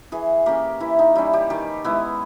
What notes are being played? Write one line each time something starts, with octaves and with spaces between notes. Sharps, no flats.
E3 G#4
A#3 C#4 G4
E3 E4
D#4
G3 C#4 E4
G4
D#3 G4
G#3 B3 E4